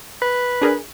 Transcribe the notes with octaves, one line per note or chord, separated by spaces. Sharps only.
B4
D4 G#4 A#4